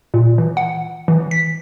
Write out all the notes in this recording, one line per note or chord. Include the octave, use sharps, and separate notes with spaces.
A#2
E3
F#5
E3
B6